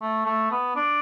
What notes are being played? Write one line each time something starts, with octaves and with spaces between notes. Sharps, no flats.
A3
A3
B3
D4